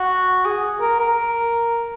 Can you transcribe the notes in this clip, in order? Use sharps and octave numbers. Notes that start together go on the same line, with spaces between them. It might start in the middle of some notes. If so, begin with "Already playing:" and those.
Already playing: F#4
G#4
A#4
A#4